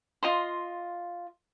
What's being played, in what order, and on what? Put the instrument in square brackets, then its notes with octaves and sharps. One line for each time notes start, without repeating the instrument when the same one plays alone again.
[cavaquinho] F4 D#5 C6